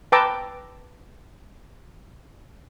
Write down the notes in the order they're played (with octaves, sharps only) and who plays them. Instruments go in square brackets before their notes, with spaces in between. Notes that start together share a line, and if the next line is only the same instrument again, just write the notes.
[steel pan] B4 G5 A5 A#5 D6 E6